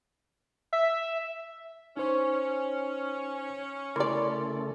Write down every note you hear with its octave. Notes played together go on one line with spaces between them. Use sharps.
E5
C#4 D#4 C5 C#6
C#3 E3 A3 A#4 D5 C6